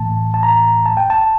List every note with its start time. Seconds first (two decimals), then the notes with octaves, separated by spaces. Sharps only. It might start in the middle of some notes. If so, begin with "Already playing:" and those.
Already playing: A2 E3 A3 A5
0.34 A5
0.43 A#5
0.86 A5
0.97 G5
1.10 A5